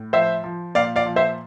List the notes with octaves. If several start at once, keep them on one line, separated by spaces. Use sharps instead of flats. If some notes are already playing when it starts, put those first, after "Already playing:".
Already playing: A2
F3 C5 E5
F3
A#2 D5 F5
D5 F5
F3
C5 E5